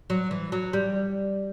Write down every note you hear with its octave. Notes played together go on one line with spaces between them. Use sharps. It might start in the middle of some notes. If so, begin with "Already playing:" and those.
F#3
E3
F#3
G3